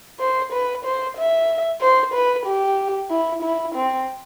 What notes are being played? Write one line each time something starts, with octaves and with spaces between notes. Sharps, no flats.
C5
B4
C5
E5
C5
B4
G4
E4
E4
C4